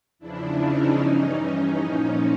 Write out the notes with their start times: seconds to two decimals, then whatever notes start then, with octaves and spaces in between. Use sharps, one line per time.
0.19 E2 C#3 F3 D4 E4
0.58 C#4 D#4
0.99 G2 E3
1.39 C#4 D#4
1.79 A#2 F3